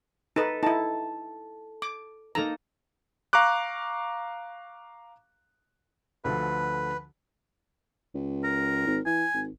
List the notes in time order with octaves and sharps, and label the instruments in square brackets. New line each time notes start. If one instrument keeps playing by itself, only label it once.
[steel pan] D#4 B4 [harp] A4
[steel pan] D#4 E4 [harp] A5
[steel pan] D6
[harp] A#3 D#4 A4 [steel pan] A#5
[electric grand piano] F5 A#5 C#6 D6 F#6
[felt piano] D2 D3 F3 [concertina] B4
[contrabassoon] C#2
[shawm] A#4
[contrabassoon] G#1
[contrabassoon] E3 [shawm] G#5
[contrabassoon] G#1